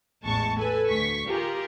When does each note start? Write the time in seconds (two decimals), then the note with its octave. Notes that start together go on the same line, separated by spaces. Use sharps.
0.25 A1 E2 G#3 A5 C#6
0.59 A4 B4 G#5
0.89 D2 C#6 B6
1.27 F4 G4 G#4 A#4